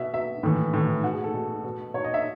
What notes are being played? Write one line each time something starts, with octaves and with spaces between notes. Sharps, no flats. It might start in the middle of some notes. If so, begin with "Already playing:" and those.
Already playing: B2 E5
B2 E5
A2 E3
A2 E3
B2 F#4
G#4
A4
B2
B2
B2 C#5
D#5
E5